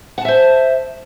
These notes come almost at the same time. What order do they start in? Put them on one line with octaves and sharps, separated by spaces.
F#5 A5 E5 C5